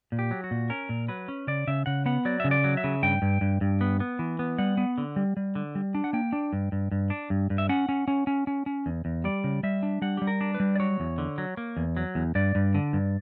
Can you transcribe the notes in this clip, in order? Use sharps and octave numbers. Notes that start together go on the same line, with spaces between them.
A#2
G4
F#3
F#4
A#2
C#4 A#4
A#2
F#3 B4
C#4
C#3 D5
C#3 E5
C#3 F#5
B3 F#5
F#3 D5
C#3 E5
D5
F#3
E5
C#3
G2 G5
G2
G2
G2
B3
B3
E3
B3
G3 F#5
B3
D3
G3
G3
D3
G3
D4
F#5
A#3 G5
D4
G2
G2
G2
D4
G2
G2
E5
C#4 F#5
C#4
C#4
C#4
C#4
C#4
E2
E2
G3 D5
C#3
G3 E5
D4
G3 F#5
G3 G4
A#4
D4
B4
G3
D5
F#3 C#5
E2
D3
F#3
A#3
E2
F#3
E2
G2 D5
G2
D3
G2